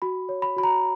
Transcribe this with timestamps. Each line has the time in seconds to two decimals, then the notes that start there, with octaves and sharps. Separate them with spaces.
0.02 F#4 B5
0.29 C#5
0.42 B5
0.57 F#4 B5
0.63 A#5